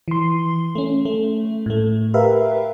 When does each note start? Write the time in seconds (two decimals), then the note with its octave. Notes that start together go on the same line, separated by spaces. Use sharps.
0.08 E3 C6
0.75 A3 C#4
1.05 A3
1.66 A2 A3
2.14 G4 A#4 B4 E5 F5